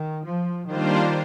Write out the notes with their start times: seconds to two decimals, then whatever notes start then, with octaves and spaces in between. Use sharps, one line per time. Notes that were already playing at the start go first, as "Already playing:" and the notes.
Already playing: D#3
0.24 F3
0.67 D#3 G3 A#3 D4 F4 C5